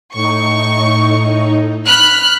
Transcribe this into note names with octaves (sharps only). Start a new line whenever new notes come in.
A2 D#4 C#6
B5 F6 F#6